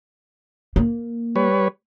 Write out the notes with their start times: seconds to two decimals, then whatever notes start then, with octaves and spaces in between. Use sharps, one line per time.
0.76 A#3
1.36 G3 B4 C#5